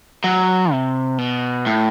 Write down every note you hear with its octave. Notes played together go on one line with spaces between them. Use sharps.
F#3
C3
B2
A2